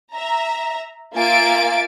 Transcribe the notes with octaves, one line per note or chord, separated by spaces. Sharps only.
E5 A#5
A#3 F4 E5 G#5 A6 D7